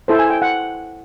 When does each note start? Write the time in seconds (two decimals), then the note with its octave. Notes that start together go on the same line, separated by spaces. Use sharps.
0.08 E4 A4 C5
0.19 G#5
0.30 G5
0.42 F#5